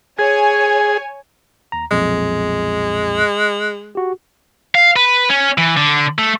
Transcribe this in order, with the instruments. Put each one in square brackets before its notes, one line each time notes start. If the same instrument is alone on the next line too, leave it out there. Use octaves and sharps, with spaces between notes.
[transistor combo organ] G#4 [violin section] C#5 G#5
[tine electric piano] D#2 A#5
[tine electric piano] B1 F2 A#2 [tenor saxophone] G#3
[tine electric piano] F#4 G4
[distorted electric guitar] F5
B4
C#4
E3
D3
A3